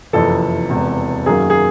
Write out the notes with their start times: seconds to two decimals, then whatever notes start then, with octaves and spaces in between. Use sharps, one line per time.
0.13 F#1 F2 C3 E3 A4
0.69 E1 E2 C3
1.26 F#2 D#3 F#3 A#3 G#4
1.50 G#4